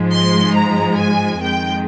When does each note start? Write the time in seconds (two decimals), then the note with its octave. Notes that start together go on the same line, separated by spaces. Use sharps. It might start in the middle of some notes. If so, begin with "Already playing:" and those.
Already playing: G#2 F3 G#3
0.14 C6
0.57 A#5
0.99 G#5
1.41 F2 D#3 G#3 G5